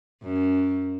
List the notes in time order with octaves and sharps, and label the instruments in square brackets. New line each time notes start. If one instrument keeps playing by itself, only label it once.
[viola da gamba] F#2